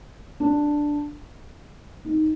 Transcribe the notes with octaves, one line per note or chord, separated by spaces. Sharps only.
D4
D#4